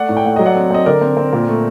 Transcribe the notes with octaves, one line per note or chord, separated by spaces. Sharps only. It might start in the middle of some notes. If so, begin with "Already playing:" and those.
Already playing: A3 D5 F#5
A2
G5
A3 F#5
F#3 D#5
D5 F#5
C4
C4 D#5
D3 A#4 D5
C4
C4
A#2
A3